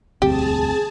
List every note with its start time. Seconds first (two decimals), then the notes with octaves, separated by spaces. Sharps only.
0.22 E1 D2 G2 C4 G4 G#4 A5